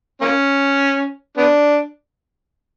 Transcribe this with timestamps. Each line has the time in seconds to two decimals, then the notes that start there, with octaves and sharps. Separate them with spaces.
0.22 A#3 C#4
1.37 B3 D4